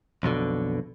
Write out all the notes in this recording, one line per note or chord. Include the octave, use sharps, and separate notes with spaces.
B1 F2 B2 D3